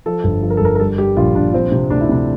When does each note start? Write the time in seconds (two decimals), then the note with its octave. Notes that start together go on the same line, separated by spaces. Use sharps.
0.06 F3 A4
0.24 G1
0.43 F3
0.50 A#4
0.57 A4
0.61 G1 A#4
0.75 A#4
0.80 G3 A4
0.98 G3 G4
1.17 A#1 F4
1.35 A#1 D4
1.53 F3 C4
1.72 C3
1.90 D2 D4
2.01 E4
2.09 C3 D4